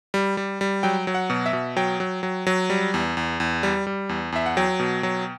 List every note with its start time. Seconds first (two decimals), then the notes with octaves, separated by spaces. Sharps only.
0.14 G3
0.37 G3
0.61 G3
0.83 F#3 G5
1.07 F#3
1.14 F#5
1.30 B2
1.46 E5
1.53 B2
1.76 F#3 G5
2.00 F#3
2.23 F#3
2.47 F#3
2.70 G3
2.94 E2
3.17 E2
3.40 E2
3.63 G3
3.87 G3
4.09 E2
4.32 E2 E5
4.46 F#5
4.57 F#3 G5
4.79 B2
5.03 F#3